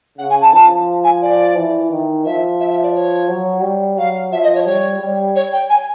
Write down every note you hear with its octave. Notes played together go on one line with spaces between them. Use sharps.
C#3 F#5
G#5
A5
F3 A5
G#5
D5
E3
D#3
F3 E5
E5
E5
D5
C#5
F#3
G3
F#3 F5
F3 E5
D#5
C#5
G3 C#5
G3
C#5
G5
G#5